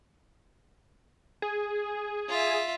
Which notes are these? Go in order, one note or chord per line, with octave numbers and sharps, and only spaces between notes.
G#4
F4 E5